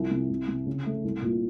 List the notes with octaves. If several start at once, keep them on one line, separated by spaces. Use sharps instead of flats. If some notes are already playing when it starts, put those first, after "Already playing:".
Already playing: C2 F3
C3
C2
C3
C#3
A3
C2
A#2